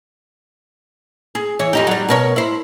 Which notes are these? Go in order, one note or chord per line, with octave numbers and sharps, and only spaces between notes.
G#4
E3 C#5
F2 D#4 G4
F#3 G3
B2 A#4 C#5
E4 C5